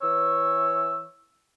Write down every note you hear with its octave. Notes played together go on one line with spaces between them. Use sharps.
E3 C#5 E6